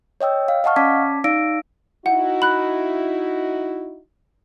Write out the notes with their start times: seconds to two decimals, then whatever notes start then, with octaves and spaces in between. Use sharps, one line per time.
0.21 C#5 D#5 G5 E6
0.48 F5
0.64 D#5 F5 F#5 A5 C#6 F6
0.76 C#4 D5 A5 D6 G#6 B6
1.24 D#4 D5 F5 E6 A#6 D7
2.06 D#4 E4 F#4 F#5
2.42 B5 F#6